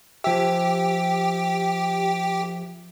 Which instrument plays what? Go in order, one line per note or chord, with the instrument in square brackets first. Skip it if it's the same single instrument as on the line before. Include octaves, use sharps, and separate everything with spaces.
[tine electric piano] F3 E5 [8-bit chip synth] G4